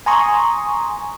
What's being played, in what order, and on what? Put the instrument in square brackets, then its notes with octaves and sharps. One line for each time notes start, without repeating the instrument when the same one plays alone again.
[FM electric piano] G#5 A#5 C6 C#6 D#6